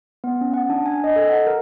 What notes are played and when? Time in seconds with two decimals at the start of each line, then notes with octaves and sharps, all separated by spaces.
0.24 B3
0.41 C#4
0.54 F#5
0.70 D4
0.86 G#5
1.04 D#5
1.16 A4
1.29 F#5
1.47 A#4